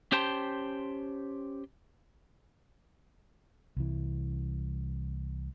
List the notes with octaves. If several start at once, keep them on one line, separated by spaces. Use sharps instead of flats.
C#4 G4 C5 G5 A5 C6
C2 E3